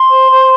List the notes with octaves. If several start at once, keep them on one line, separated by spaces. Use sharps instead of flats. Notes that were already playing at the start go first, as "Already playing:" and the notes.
Already playing: C6
C5
C5